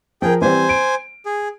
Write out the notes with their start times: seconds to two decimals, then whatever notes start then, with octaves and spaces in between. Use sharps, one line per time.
0.22 F3 G#4 A#4 G5
0.42 E3 G3 C4 C5 G#5
0.69 D7
1.26 G#4